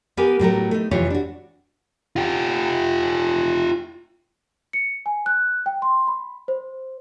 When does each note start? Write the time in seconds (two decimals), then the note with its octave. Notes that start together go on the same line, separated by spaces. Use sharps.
0.17 B3 G4 A#4 B4 G#5
0.39 A2 F#3 A3 A#4
0.71 A3 D#4
0.91 F2 C3 E3 F4 G4 C#5
1.10 D4 F#4
2.16 F4 G4
4.73 C#7
5.06 G#5
5.26 F#6
5.66 G5
5.82 C6
6.07 B5
6.48 C5